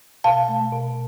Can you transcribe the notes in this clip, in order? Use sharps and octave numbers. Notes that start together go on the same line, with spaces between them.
B2 F5 A5
A3
B2